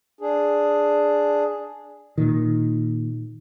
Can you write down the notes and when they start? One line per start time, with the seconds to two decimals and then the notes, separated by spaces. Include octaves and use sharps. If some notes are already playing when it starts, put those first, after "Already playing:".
0.21 D4 G#4
2.18 A#2 D#3